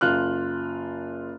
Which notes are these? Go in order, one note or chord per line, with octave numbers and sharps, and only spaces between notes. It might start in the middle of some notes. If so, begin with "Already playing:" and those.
F#1 F4 F6 F#6